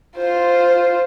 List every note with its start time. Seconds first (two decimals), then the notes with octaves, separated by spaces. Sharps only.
0.17 F4 C5